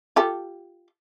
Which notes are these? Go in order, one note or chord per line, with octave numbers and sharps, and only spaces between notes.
F4 G4 A4